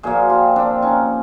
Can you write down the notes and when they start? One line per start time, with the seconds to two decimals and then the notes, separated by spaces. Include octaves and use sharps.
0.03 A#2 F3 A#3 F#4 G#4
0.29 F4 G4
0.56 C4 D4
0.82 C#4 D#4